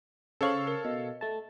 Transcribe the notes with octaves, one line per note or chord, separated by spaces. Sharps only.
C#3 A4 C5 C#5 F5 C#6 F#7
A#4
B2 D#5
A3 A5